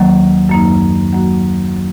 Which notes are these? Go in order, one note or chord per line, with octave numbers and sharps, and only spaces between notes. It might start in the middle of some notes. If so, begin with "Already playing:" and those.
Already playing: D#2 D#3 F#3 A#3
F#2 F#3 A#3 D#4
F#3 A#3 F#4
F#3